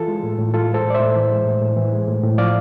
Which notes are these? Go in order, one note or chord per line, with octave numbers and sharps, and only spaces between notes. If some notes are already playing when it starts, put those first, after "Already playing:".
Already playing: E3 F4 A4
G#3
A2
A2
E3 F4 A4
G#3 A4 C5
A2
D5
C5 E5
A2
E3
G#3
A2
A2
E3
G#3
A2
A2
F3 D5 F5